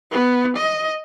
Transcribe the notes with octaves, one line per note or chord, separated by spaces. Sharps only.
B3
D#5